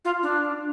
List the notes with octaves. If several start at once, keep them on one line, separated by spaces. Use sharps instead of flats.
F4
D4